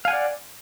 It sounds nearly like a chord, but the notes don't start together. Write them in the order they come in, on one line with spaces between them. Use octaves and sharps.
F5 G#5 F#5 D5